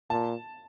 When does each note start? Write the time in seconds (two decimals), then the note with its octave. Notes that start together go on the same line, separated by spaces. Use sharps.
0.10 A#2 A5